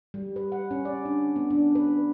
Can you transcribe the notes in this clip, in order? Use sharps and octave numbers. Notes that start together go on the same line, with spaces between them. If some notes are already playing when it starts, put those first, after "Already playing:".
G3
B4
F#5
C#4
D5
D4
B3
D4
B4